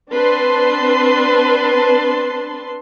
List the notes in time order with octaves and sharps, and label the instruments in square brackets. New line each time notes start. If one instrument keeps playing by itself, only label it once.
[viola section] C4 D4 B4 A5 C6